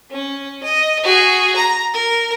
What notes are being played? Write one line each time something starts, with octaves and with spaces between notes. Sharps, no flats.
C#4
D#5
F#4 G#4
A#5
A#4